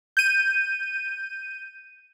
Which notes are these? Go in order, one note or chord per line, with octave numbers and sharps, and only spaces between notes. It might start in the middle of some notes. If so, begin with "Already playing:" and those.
G6 D#7